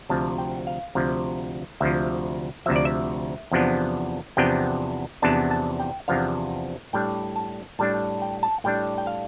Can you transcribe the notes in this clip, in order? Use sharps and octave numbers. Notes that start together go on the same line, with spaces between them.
D2 C3 F3 A5
G5
F5
D2 C3 F3
D2 C3 F3 E5
D2 C3 F3 E5
D5
E5
E2 C3 F3 B3 D4
E2 C3 F3 B3 D4 G5
E2 C3 F3 B3 D4 A5
A5
G5
E2 C3 F3 B3 D4 F5
A2 G3 D4 G5
A5
A2 G3 D4 A5
G5
A5
A2 G3 D4 G5
G5
F5